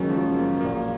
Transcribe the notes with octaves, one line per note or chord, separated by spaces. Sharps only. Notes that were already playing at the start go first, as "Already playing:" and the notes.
Already playing: F#1 F#2 D#3 F#3 G#3 C#4
F3
F#3
A#3
A#1 A#2 F#3 A#3